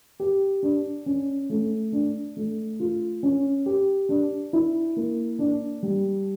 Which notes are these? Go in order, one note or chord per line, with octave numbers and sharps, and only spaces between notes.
G4
D4
C#4
A3
D4
A3
F4
C#4
G4
D4
E4
A#3
D4
G3